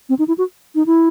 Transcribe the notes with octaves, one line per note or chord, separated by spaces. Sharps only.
C4
D#4
E4
F#4
D#4
E4